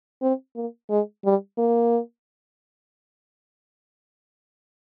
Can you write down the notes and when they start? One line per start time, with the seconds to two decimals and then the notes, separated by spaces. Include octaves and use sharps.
0.22 C4
0.56 A#3
0.90 G#3
1.25 G3
1.58 A#3